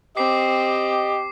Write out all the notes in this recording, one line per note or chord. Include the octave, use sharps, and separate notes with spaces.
C4 G4 D#5 D6 C7